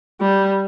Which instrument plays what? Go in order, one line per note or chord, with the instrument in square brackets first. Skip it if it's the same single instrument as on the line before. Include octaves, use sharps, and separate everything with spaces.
[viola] G3